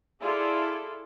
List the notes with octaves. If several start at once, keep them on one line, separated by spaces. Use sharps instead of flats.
E4 F4 G#4 A4 D5